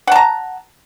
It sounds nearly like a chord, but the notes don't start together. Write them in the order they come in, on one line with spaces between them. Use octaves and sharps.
F#5 A5 A#5